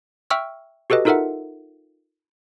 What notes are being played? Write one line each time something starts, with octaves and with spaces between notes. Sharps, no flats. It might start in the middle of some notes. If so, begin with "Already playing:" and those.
E5 G5 C#6 E6 F6
F#4 G4 A4 B4 D#5
D#4 F4 A4 A#4 E5 F#5